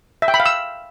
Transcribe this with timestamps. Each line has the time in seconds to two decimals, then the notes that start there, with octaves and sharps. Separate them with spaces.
0.22 E5
0.28 G5
0.34 B5
0.40 F5
0.46 E6